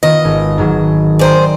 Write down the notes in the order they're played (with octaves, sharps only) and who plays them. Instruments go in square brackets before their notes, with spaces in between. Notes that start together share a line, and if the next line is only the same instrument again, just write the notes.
[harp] D#3 B3 F4 [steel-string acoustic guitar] D#5
[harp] G#1
G#2 D#3 F#3
[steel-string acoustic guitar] G#4 C5 [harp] D5 G5 A#5